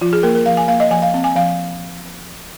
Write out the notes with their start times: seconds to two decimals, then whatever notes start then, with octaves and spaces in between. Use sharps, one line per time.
0.01 F3 F4
0.13 G#4
0.23 A#3 A#4
0.35 A#4
0.46 F3 F5
0.57 G#5
0.68 A#3 F5
0.80 D#5
0.90 F3 G#5
1.02 F5
1.14 C4
1.24 G#5
1.36 F3 F5